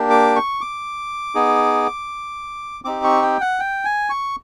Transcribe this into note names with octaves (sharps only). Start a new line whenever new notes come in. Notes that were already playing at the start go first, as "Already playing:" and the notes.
Already playing: A#3 D4 G4
D6
C#6
D6
B3 D#4 G#4
C4 D#4 G4 D6
C#6
G5
F#5
G5
G#5
C#6